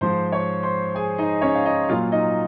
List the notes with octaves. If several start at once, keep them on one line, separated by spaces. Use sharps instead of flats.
G#2 F3 C5 C6
C#5 C#6
C5 C6
G#4 G#5
D#4 D#5
C#4 C#5
F5
D#4 D#5
A#2 F#3 F4 F5
D#4 D#5